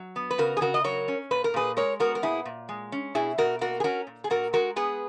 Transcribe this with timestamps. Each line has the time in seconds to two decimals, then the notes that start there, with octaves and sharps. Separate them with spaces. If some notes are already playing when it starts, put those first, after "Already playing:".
Already playing: F#3
0.16 B3
0.31 B4
0.38 C#3 F#4 A#4
0.57 G#4
0.61 C#3 F#4 A#4
0.74 D#5
0.84 F#3 A#4 C#5
1.08 C#4
1.31 A#2 B4
1.44 A#4
1.54 A#2 G#4 B4
1.77 G#3 A#4 C#5
2.00 B3 F#4 A#4
2.15 A#4
2.22 A#2 E4 G#4
2.45 A#2
2.69 G#3
2.92 C#4
3.15 B2 E4 G#4
3.38 B2 F#4 A#4
3.61 A#3 F#4 A#4
3.80 G#4
3.84 C#4 F#4 A#4
4.07 A#2
4.24 G#4
4.30 A#2 F#4 A#4
4.53 G#3 F#4 A#4
4.76 B3 G#4 B4